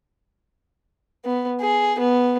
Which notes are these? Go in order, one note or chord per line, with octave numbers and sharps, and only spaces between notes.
B3
G#4
B3